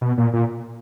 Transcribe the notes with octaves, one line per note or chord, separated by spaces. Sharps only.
B2
A#2
A#2